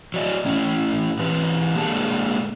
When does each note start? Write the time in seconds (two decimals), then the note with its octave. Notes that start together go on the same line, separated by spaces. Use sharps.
0.14 F#3 D5 D#5
0.45 A2 C#4
1.19 E3 G4 B4
1.76 A#2 G#3 A#3 D4 A4 A5